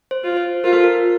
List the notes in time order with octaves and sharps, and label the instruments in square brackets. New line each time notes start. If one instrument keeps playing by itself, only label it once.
[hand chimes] C5
[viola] F4
[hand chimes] C5
[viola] F4 [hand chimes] A#4
[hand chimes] A4
A#4